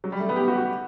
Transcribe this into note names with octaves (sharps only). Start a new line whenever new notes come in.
F#3
G3
A3
B3
G4
F#4
F#4